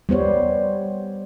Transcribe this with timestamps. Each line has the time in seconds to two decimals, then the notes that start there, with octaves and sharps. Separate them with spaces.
0.09 G3 B3 C5 C#5